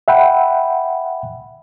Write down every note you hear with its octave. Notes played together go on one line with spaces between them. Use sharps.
E5 F#5 G5 B5